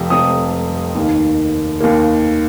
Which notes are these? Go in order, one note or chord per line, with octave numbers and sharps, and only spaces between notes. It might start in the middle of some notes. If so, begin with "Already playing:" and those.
Already playing: F1 F2 C3 F3
F1 F2 C3 F3 C4 D#6
D#2 D#3 A#3
D#2 D#3 A#3